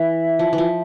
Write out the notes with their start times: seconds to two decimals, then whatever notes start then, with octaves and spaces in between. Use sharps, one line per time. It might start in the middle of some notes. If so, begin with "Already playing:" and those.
Already playing: E3 E5
0.39 F3
0.53 E3
0.58 F3